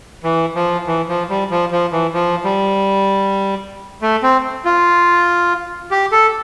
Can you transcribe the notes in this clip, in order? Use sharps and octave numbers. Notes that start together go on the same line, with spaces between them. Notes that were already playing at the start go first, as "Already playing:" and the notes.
E3
F3
E3
F3
G3
F3
F3
E3
F3
G3
A3
C4
F4
G4
A4